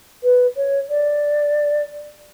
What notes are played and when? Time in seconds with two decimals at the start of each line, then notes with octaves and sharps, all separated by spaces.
0.24 B4
0.57 C#5
0.90 D5